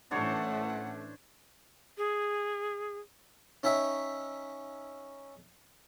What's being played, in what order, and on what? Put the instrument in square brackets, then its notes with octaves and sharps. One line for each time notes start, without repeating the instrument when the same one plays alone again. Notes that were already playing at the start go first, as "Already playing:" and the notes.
[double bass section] A2 E3 C#4 [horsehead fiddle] A3 [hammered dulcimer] D4 C5 C#5 [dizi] F#5
[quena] G#4
[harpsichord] C#4 D#4 C#5 E5 G5